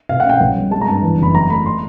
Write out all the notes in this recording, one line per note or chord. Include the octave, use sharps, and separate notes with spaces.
B2 F5
F#5
C#4 G5
B1
G3
G#3 A5
A#5
G2 A5
E2
F#1 B5
F#3 A#5
A3 B5
C6